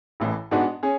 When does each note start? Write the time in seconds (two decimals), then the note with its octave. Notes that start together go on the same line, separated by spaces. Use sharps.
0.20 A1 A2 E3
0.51 G#2 G#3 B3 D4 F#4
0.83 C#4 G#4